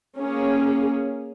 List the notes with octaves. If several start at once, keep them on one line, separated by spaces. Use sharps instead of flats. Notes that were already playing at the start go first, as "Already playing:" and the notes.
A#3 C#4 G#4